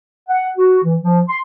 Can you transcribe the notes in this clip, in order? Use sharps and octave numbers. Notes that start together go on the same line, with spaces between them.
F#5
F#4
E3
F3
C6